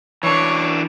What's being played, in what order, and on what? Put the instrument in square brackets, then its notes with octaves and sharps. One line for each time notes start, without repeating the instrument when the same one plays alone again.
[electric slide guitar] E3 D4 [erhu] C#5